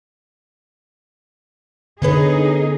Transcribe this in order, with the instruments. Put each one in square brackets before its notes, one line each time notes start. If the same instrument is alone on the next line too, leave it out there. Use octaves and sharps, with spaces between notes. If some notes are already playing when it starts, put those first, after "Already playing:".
[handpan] D3 [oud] B3 C#4 B4 [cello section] D#4 G#4